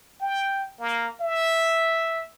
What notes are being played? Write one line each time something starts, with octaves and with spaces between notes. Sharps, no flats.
G5
A#3
E5